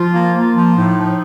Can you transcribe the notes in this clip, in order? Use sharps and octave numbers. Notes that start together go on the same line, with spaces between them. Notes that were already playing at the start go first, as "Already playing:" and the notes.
Already playing: F3 F4
A#3
A#3
F3
A2 D#4
F3